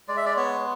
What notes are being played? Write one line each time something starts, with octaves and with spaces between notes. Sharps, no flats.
G#3 D5
E5
D5
B3 C#5